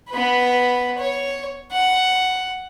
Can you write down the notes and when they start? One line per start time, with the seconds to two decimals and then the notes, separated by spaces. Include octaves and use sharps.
0.10 B3 B4
0.99 C#5
1.72 F#5